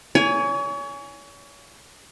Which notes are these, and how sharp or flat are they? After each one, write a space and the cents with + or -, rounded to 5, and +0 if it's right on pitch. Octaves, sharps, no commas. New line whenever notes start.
C#5 +35 G#5 +0